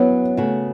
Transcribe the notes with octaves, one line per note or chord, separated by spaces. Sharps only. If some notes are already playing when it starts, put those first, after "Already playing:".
Already playing: F#3 B3 C#4 E4
C#3 A3 F#4